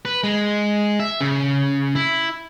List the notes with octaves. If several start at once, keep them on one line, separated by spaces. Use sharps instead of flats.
B4
G#3
E5
C#3
E4